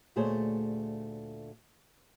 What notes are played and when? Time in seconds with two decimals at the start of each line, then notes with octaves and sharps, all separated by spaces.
0.16 D2 A#2 A3 G#4 C5 C#5